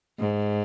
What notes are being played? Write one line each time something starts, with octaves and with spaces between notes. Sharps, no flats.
G#2